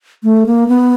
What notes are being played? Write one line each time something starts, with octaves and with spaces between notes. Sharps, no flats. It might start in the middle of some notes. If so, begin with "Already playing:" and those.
A3
A#3
B3